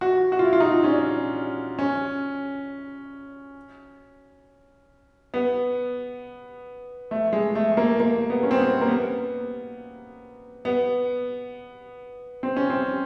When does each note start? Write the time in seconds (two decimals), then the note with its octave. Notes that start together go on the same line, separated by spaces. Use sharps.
0.01 F#4
0.32 F#4
0.39 F4
0.45 E4
0.53 F4
0.60 D#4
0.84 C#4
0.91 D4
1.79 C#4
5.34 B3
7.11 A3
7.33 G#3
7.55 A3
7.77 A#3
8.00 A#3
8.30 B3
8.43 C#4
8.51 C4
8.58 B3
8.81 A#3
8.88 B3
10.65 B3
12.43 C4
12.56 C#4
12.70 C4